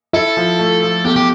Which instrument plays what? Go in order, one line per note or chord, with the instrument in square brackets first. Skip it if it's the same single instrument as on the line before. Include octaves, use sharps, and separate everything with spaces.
[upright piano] E4 [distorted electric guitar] A4
[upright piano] F3
A3
F3
[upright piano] E2 [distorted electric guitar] G4
[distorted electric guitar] G4